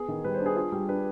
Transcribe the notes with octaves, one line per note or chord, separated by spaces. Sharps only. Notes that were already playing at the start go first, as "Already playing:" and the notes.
Already playing: B3 G#4
D#3
G3 B4
C5
D4
G#4
F4 G#4
G3
D4 B4